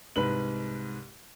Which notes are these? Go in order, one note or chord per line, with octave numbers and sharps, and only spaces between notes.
C2 G#2 B4 F#7